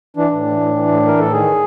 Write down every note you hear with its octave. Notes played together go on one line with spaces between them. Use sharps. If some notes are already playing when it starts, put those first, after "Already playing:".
E3 D4
A2
E3
A2
E3
A2
E3 A#4
A2 A4
D#3 G#4